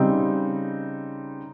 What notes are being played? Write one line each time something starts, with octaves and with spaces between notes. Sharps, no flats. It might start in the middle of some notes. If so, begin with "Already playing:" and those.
Already playing: C#3 G3 C4 D#4